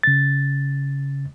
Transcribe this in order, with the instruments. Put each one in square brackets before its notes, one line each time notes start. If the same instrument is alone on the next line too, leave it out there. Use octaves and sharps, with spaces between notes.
[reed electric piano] C#3 A6